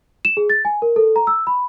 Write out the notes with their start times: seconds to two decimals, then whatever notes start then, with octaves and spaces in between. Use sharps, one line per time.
0.25 E7
0.37 G#4
0.50 A6
0.65 G#5
0.82 A#4
0.96 A4
1.16 A#5
1.27 E6
1.47 B5